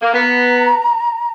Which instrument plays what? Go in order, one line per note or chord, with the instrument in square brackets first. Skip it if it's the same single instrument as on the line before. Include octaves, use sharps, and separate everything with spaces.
[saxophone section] A#3
[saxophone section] B3 [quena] A#5